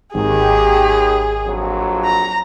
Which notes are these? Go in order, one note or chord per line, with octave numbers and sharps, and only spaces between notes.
G#1 D#2 D#3 G4 G#4
A#1 F2 F#3
A#5